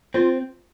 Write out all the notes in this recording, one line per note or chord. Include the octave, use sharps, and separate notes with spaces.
C4 F4